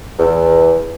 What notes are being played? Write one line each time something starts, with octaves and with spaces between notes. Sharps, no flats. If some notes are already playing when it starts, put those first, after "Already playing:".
E2